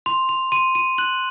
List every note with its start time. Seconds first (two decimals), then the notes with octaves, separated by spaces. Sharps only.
0.06 C6 F7
0.29 F7
0.52 C6 D#7
0.75 D#7
0.98 F#6 F#7